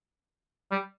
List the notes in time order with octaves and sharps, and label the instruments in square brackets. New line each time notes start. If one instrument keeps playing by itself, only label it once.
[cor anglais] G3